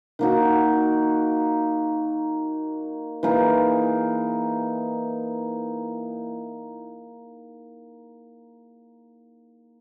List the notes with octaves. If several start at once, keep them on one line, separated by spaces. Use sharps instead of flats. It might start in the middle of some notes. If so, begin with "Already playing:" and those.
D#3 A#3 D#4 F#4
E3 A#3 D#4 G#4